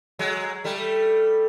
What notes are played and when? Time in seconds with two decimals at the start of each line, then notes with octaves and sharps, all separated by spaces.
0.19 F#3 G#3
0.64 G3 A3